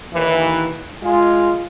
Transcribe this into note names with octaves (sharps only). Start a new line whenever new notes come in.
D#2 E3
G#3 F4